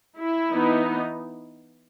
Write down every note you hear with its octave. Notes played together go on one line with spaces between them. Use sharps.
E4
E3 B3 D#4